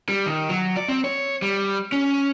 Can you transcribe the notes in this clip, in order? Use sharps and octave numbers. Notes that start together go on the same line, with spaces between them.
G3
D#3
F#3
D5
C4
C#5
G3
C#4